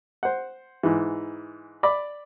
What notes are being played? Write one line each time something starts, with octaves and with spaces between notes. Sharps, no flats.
C5 F#5
G#2 E3
D5 B5 D6